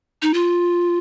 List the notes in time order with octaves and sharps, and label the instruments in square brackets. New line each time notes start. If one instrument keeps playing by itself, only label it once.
[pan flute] D#4
F4